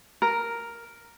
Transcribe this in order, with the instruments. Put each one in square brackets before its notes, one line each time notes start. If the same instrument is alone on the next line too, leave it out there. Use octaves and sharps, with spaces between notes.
[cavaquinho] A#4